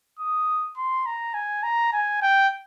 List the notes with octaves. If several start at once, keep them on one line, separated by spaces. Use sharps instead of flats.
D#6
C6
A#5
G#5
A#5
G#5
G5